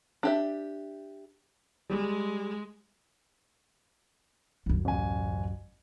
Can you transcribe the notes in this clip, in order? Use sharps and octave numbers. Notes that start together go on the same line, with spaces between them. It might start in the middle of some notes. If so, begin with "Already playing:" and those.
D4 G4 E5
G3 G#3
C#2 F#2
A1 G#5